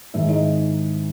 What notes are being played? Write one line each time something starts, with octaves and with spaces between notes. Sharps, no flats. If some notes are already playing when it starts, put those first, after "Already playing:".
G#2 D#3 G#3 E4 E5
D#4 D#5